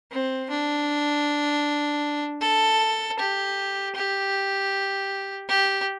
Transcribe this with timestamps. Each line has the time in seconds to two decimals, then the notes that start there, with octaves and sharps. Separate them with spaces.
0.12 C4
0.50 D4
2.42 A4
3.19 G4
3.96 G4
5.49 G4